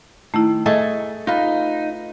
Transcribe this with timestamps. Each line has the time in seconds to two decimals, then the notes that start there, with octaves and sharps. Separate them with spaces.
0.34 D#3 A3 E4
0.66 A3 G#4 A4 D#5
1.27 D#4 F4 B4